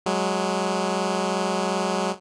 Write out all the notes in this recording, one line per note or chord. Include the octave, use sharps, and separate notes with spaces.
F#3 G#3